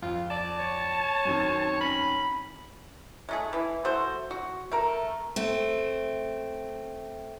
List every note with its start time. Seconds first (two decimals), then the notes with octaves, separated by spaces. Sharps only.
0.02 F2 F4
0.30 D5 A5
0.59 C#5
1.25 F#2 D#3 C4
1.81 C#4 B5
3.29 G#3 A3 G#4
3.53 E3
3.85 A3 F#4 C5
4.31 F#4
4.71 A3 A#4
5.36 A3 C4